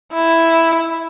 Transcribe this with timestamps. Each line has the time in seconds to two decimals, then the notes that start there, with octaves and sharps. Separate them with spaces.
0.13 E4